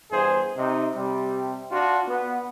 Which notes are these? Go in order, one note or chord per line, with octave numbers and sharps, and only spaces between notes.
E2 G2 G#4 C5
C3 D#4
C3 G3
D4 F4 F#4
B3